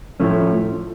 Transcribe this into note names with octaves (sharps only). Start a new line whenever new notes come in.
A2 F3 A3 C#4